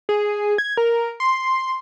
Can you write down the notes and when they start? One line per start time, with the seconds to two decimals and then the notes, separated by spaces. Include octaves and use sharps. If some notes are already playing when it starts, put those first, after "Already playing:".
0.09 G#4
0.58 G#6
0.77 A#4
1.20 C6